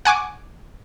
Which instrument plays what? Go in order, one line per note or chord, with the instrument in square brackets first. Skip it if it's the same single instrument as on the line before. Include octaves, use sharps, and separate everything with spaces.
[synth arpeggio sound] F#5 G#5 C#6 D6